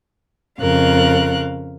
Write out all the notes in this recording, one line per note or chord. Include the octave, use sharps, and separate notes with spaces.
F2 C#3 A#4 F5 F#6